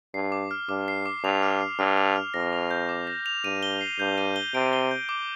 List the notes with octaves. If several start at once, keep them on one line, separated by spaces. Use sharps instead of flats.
G2 C7
D6
F6
G2 D6
C7
D6
G2 F7
F6
C7
G2 F6
F7
F6
F2 A#6
F7
G6
D6
A#6
F7
G2 D#7
G7
C7
G2 G6
D#7
G7
C3 D7
G7
G6
D6